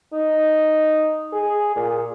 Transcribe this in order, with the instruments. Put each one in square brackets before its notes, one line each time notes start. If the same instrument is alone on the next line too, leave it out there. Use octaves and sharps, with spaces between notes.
[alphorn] D#4
G#4
A#2